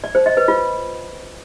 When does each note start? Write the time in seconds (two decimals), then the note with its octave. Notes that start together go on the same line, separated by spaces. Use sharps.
0.04 D5
0.15 C5
0.26 D#5
0.37 B4
0.48 F4